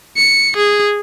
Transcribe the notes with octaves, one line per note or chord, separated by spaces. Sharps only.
C#7
G#4